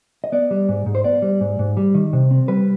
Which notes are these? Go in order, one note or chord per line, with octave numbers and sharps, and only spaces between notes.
D#5
B3 D5
G3
G#2
G#2
C5
B3 D5
G3
G#2
G#2
G3
D#3
C3
C4
G3 B4